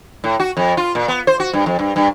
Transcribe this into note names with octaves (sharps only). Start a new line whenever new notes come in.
A2
F#4
F2
F4
A#2
B3
C5
F#4
G2
F2
G2
G2